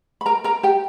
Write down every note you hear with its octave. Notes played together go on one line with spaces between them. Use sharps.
B5
A#4 A#5
A#4 A#5
G4 G5